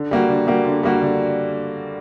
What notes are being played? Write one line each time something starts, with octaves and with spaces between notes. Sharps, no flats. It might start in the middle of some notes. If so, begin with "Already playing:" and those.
Already playing: D3
G3 A#3 F#4
D3
G3 A#3 F#4
D3
G3 A#3 F#4
D3